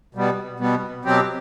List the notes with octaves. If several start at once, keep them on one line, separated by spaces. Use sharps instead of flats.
B2 G3 B3
B2 G3 B3
B2 F#3 C4 G4